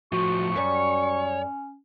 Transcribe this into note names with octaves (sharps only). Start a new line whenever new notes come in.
A2 F3 F#4 C#6
F#2 G3 C#4 C#5